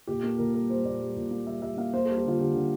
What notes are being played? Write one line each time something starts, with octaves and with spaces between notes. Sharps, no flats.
A#2 G4
A#3 A4
A#2 A#4
G3 A#4
G3 C5
A#2 D5
G3
A#2
A#3
G3 E5
G3 E5
A#3 F5
A#3 C5
G3 A4
G4
D3 F4
D3 G4
D3